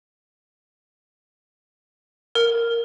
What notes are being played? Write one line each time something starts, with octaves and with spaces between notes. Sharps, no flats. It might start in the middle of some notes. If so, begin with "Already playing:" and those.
A#4